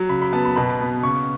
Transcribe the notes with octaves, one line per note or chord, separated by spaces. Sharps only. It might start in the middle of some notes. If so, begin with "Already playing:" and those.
Already playing: F#3
C#3 B5
B5
B3 A5
B5
B2 B5
B3
C#3 C#6